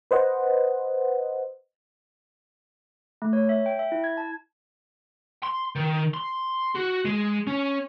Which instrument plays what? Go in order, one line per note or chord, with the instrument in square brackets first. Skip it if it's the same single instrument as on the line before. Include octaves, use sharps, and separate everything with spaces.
[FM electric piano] B4 C5 D#5 F#5
[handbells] A3
C#5
E5
G5
E5
E4
G#6
A5
[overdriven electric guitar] C6
D#3
C6
F#4
G#3
C#4